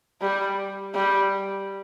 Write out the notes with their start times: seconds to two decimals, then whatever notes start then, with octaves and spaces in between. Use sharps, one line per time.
0.21 G3
0.95 G3